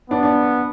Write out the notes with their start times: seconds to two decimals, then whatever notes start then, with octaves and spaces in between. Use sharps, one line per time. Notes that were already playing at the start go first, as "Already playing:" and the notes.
0.10 B3 D4
0.23 D4